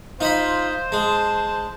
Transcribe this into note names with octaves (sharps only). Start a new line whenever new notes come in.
D#4 F4 C5 D#5 B5
G#3 A5